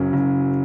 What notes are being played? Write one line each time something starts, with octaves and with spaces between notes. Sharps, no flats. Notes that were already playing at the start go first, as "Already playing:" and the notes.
Already playing: F#1 F#2 C#3 F#3 C#4
F#1